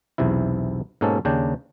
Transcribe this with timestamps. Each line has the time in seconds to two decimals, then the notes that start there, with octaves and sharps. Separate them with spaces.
0.18 B1 E2 C3 E4
1.01 G#2 B2 A#3 C#4 A4
1.25 D#2 C#3 D4 G5